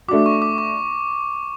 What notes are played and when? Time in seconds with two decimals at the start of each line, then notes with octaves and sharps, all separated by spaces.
0.08 A3 D4 F#4 D6
0.26 C#6
0.42 D6
0.58 C#6